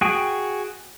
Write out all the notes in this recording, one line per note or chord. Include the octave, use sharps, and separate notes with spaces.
F#4 G#4 G5